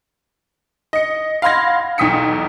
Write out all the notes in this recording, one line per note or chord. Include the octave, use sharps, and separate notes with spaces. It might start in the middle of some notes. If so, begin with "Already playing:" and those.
D#5 C#7
F5 F#5 B5 C6 G#6 A#6
B1 E2 G5 D#6 B6 C#7